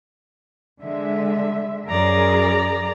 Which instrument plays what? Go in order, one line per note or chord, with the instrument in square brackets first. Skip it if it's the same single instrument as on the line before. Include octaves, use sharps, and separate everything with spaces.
[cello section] D3 G#3 E5
[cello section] F#2 G#4 A#4 [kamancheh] D5 A#5